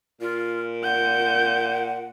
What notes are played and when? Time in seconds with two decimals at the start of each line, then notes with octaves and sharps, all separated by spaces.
0.21 A#2 F4
0.84 F#5 G6